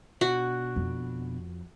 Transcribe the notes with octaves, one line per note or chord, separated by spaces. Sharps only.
B2 D4 F#4
F2